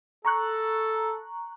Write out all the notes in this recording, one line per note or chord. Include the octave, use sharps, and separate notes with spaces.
A4 A#5 C#6 F#6